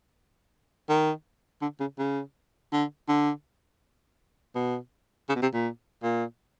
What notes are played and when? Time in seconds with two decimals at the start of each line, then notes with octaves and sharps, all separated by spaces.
0.89 D#3
1.61 D3
1.80 C#3
1.98 C#3
2.73 D3
3.08 D3
4.55 B2
5.29 C#3
5.36 B2
5.42 C3
5.54 A#2
6.02 A#2